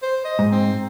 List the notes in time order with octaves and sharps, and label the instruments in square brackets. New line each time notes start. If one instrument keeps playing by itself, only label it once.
[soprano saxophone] C5
D#5
[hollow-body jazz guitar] G#2
[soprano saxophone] C4